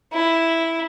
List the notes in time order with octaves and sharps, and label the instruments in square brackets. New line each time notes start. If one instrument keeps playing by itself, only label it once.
[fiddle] E4